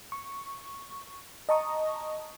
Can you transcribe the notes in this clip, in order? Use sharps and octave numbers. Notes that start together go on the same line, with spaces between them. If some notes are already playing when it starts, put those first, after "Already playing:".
C#6
D#5 A5 A#5 C#6 D#6